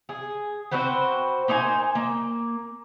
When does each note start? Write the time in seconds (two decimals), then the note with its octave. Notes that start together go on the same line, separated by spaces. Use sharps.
0.09 G#4
0.71 C4 F#4 B4 C5
1.48 A#3 D#4 C5 G#5
1.95 A#3